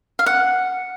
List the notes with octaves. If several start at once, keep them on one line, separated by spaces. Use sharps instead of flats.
F5
F#5